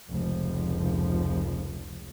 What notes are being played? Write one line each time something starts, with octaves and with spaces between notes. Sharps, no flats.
F1 C#2 F3